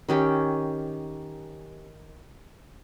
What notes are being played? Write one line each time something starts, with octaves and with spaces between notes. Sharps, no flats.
D#3 C#4 G4